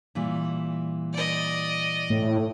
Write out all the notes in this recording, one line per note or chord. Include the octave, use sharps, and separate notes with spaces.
A#2 E3 G3
D5 D#5
A2